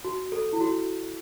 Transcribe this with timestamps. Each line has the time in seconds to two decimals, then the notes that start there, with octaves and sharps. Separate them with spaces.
0.04 F#4
0.32 A4
0.53 E4
0.61 F#4